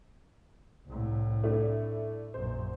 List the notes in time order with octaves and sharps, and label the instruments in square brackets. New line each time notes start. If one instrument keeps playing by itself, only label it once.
[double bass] C2 A2
[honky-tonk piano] A3 D4 E4
[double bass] A#1 F#2 [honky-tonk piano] C5